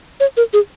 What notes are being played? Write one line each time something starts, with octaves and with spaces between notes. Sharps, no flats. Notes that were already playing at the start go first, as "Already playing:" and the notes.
C#5
A#4
G#4